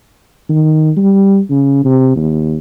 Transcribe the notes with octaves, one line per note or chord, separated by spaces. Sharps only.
D#3
G3
C#3
C3
D#2